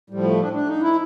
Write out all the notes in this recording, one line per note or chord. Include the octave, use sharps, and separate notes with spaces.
A2 F3 G3
A3
D4
D4
D#4
E4